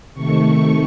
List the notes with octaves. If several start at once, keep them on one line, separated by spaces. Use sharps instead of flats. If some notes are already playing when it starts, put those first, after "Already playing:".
C3 D#3 A3 C#6